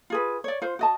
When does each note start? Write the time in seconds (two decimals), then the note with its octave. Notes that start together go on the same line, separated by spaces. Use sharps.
0.10 F4 G#4 B4
0.44 C#5 D5
0.62 F4 C5
0.79 F#4 D#5 A5